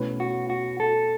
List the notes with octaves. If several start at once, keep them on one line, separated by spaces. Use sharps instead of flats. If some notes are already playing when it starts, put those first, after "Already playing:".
Already playing: B2 A3 C#4 E4 B4
F#4
F#4
A4